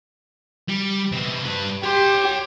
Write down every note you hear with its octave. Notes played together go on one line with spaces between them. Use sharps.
G3
B2 C4
G2 B4
G4 C#5 C6